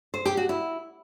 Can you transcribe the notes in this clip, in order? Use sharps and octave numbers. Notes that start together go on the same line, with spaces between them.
C5
G4
F#4
E4